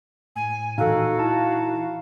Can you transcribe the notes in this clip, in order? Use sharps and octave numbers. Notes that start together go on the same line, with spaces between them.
A2 G#5
A#2 E3 D#4 F#4 A4 F5
D#4 E4 A5